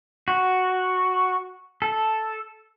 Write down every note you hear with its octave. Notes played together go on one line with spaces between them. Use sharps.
F#4
A4